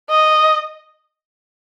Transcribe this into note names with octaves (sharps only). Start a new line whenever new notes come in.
D#5